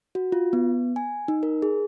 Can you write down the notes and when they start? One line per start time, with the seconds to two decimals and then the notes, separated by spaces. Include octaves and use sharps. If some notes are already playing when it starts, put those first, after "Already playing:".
0.15 F#4
0.32 F4
0.53 B3
0.96 G#5
1.28 D#4
1.43 A#4
1.62 G#4